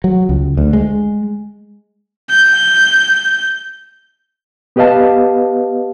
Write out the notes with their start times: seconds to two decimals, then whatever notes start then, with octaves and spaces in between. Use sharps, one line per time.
0.04 F#3
0.29 C#2
0.57 D2
0.73 G#3
2.30 G6
4.76 B3 G4 B4 D#5 F5 A5